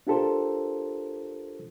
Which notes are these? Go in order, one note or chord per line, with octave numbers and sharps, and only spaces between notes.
D4 F4 G4 A4 A#4 C5